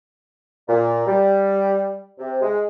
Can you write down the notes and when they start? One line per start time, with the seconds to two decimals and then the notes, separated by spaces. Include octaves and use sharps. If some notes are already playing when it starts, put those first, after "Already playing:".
0.68 A#2
1.06 G3
2.19 C3
2.42 G#3